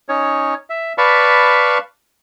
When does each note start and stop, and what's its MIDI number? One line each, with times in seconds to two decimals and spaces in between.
0.09 0.54 61
0.09 0.54 63
0.09 0.54 73
0.70 0.93 76
0.98 1.78 71
0.98 1.78 74
0.98 1.78 77
0.98 1.78 81
0.98 1.78 83
0.98 1.78 85